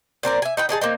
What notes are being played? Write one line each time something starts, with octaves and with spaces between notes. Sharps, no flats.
A#2 C4 A#4 D5
E5 G#5
D#4 B4 G5
D4 D#4 G#4 A5
A#3 C4 D#4